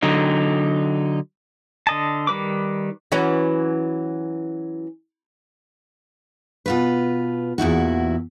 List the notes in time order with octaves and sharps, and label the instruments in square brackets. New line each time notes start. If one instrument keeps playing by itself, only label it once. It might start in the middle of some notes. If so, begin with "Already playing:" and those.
[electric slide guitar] D3 F#3 D#4
[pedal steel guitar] D3 D#5 A5
D#3 G3 B4 D6
[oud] E3 F#3 C#4
[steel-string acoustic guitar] B2 F4 B4
E2 A#2 E4 F#4